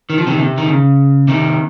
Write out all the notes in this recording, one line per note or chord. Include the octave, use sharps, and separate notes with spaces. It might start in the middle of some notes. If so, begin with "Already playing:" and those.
D#3
F3
C3 D#3
C3
D#3
C#3
C3 D#3